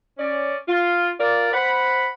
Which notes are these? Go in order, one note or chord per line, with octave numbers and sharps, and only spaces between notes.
C#4 D5
F4
F4 A#4 D5
C5 F#5 B5